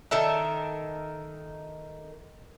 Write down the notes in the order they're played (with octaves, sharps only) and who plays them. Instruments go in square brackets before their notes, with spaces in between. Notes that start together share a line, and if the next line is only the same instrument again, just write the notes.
[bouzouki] D#3 A4 A#4 E5